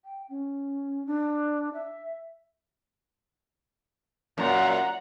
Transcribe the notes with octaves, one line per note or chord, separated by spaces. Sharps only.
G5
C#4
D4
E5
F#2 A#2 F#5 A#5